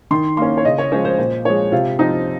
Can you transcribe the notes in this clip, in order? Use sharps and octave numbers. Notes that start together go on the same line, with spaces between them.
D#3 C6
A#3 C#4 C6
C#5
C#3 D#5
C#5
F3 G#3 C#4 C5
C5
A#2 C5
F3 G#3 C#5
C3 F4
F3 C4 D#4